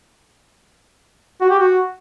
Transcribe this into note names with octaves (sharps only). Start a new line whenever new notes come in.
F#4
G4
F#4